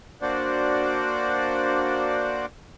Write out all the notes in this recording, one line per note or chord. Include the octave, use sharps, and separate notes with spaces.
A#3 D4 F#4 C5 D5